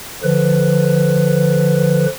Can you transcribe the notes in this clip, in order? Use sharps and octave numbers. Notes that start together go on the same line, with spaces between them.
D3 F3 B4